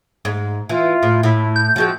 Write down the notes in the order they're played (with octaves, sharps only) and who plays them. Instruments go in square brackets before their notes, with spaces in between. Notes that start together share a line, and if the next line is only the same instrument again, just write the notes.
[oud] G#2
[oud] E3 [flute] F4
[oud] A2
[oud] A2 [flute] E4
[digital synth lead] G6
[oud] F3 G#3 C4 [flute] F#4